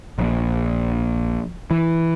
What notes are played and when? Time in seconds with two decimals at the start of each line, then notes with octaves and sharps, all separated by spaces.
0.19 A#1
1.71 E3